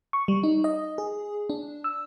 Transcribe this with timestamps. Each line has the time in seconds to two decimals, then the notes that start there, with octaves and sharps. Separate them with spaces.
0.13 C#6
0.28 G3
0.43 D#4
0.64 D#5
0.98 G#4
1.50 D4
1.84 E6